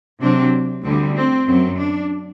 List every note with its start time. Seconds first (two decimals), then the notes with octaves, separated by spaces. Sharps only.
0.21 C3 F#3 C4 D4
0.84 D2 D3 G3 C4
1.16 C4
1.47 F#2 F#3 C4
1.78 D4